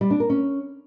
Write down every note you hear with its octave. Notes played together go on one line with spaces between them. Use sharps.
G3
D4
A#4
C#4